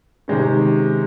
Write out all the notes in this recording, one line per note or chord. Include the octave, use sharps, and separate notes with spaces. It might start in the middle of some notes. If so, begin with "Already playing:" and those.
C3 D#3 G#3 C#4